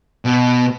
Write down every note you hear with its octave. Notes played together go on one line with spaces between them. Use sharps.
B2